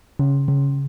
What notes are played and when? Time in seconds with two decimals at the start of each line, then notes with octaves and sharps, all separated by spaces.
0.19 C#3
0.48 C#3